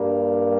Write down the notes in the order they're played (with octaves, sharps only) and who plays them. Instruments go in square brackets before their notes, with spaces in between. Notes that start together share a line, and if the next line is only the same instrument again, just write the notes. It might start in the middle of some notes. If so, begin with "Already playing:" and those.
Already playing: [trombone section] G2 G3 A#3